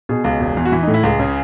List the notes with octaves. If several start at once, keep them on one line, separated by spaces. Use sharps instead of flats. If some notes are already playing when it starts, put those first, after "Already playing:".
B2 G#4
C#2
E1
E2
F#4
E3 E4
D#4
A2
E4
C#2 G#4
C#3